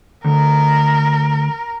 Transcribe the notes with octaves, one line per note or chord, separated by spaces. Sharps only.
D2 A#4